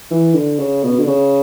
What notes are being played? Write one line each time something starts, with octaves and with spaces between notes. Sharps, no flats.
E3
D3
C#3
B2
D3
C#3